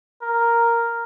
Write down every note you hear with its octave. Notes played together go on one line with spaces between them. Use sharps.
A#4